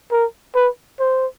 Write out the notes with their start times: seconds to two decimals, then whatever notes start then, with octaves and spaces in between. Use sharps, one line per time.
0.11 A#4
0.55 B4
0.99 C5